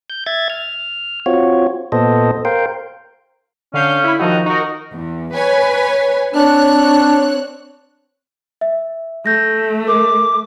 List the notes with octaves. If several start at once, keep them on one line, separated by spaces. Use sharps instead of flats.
G6
E5 G#6 A6
F6
C4 F4 F#4 C#5
A#2 B3 A4 C5 D#5
A#4 C5 F5 G5
D3 C#4 F5 G6
E4 B5
D#3 F3 D#4 F#4
D#4 F#4 A#4
E2
B4 C#5 G#5
C4 D4 C#5 F#6
E5
A3 G6 A#6
A#4 D6